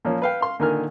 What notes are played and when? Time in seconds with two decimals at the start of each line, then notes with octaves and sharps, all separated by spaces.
0.05 A#2 F3 A#3 C#4
0.22 B4 F5 G5
0.41 F5 C6
0.60 A#2 D3 D#3 G#5 F6